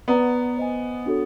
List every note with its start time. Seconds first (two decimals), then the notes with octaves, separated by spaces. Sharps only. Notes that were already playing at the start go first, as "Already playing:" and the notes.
0.08 B3 B4 D5 F#5 A#5
0.57 C5 D#5 G#5
1.06 D4 F#4 A4 C#5